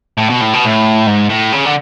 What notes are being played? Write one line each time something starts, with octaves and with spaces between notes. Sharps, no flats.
A2
B2
A2
B2
A2
G#2
A2
C#3
D3